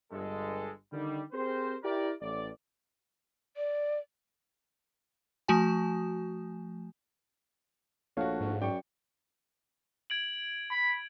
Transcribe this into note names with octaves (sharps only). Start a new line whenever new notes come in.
G1 G2 G#3 A4
D3 D#3 G3
C4 G4 G#4 A#4 C5
E4 G4 A#4 D5
A1 D5
D5
F3 A3 F#4 G#5
A#1 A3 F#4 C#5 F5 F#5
G#2
F#2 D5 G5 C#6
G#6 D7 F#7
B5